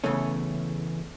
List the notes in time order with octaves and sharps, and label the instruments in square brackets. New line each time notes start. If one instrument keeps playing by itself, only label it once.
[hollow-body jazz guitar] E2 A#2 C#3 E3 A3 C#4